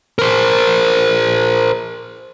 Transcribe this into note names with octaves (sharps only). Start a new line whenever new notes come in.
A#4 C5